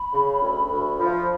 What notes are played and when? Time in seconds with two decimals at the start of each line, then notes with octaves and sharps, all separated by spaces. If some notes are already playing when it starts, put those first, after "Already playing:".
Already playing: B5
0.13 C#3
0.42 D2
0.71 D2
0.99 F3